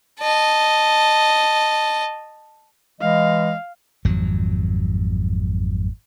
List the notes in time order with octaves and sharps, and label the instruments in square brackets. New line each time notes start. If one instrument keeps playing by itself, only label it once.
[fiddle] D#5 A5
[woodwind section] E3 G#3 D#5 [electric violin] F5
[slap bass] G#1 F2 F#3